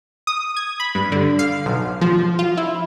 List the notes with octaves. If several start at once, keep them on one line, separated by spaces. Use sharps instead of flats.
D#6
G#6
B5
G2
D3
F5
B1
F3
F4
E4